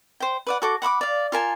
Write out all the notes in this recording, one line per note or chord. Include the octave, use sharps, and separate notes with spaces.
C5 G5
B4 D5 F#5
F#4 A4 D6
F#5 B5 C#6 D6
D5 F5
F4 A#4 G#5 A5